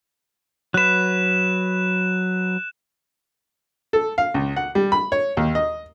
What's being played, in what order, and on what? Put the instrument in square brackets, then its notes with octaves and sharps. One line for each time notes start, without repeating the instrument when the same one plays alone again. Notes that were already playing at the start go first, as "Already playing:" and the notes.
[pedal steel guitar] F#3 B4 [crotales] F#6 E7
[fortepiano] A4
F5
C#2
F#5
G3
B5
C#5
D#2
D#5